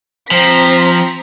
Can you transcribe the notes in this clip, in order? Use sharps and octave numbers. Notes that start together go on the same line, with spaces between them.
F3 C4 A#5 B6